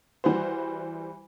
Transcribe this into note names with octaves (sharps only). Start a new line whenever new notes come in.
E3 G3 F#4 C5